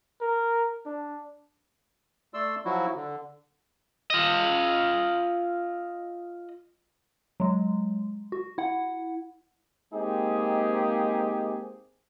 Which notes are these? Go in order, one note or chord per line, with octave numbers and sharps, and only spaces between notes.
A#4
D4
A3 D5 C6 E6
F3 F#3 E4 F#4
D3
F4 D#5
F#3 G#3
F#4
E4 F#5
G#3 A#3 C4 D#4 G4 G#4